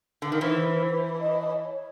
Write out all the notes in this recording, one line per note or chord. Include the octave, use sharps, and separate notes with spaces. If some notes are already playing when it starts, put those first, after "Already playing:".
D3
D#3
E3 C5
D#5
C#5
C#5